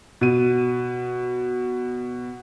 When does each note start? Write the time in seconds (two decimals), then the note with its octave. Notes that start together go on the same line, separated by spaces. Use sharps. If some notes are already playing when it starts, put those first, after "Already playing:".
0.21 B2 D#7